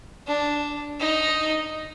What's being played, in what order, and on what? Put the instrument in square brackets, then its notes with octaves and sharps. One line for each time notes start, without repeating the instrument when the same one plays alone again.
[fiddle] D4
D#4